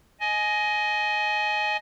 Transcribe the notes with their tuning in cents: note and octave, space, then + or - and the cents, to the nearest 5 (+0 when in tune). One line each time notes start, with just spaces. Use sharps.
D#5 +0 G#5 +20